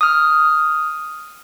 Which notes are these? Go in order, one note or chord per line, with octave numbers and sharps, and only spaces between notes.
D#6 F6